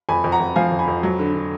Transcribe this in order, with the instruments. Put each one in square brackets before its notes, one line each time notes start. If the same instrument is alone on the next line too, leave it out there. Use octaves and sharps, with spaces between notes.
[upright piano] F2 G#5 B5
F2
F#5 A#5
F2
F3 F5 G#5
F2
G#5 B5
F2
F#3
D3
D3